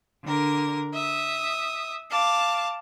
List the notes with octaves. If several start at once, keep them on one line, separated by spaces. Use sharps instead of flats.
D3 A#4
E5 D#6
F5 A5 D6